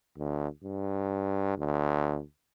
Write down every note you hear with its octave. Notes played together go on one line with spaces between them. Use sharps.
D2
G2
D2